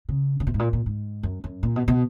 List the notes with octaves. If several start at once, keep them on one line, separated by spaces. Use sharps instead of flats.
C#3
C#3
B2
G#2
A#2
A#2
G#2
F#2
F#2
A#2
B2
B2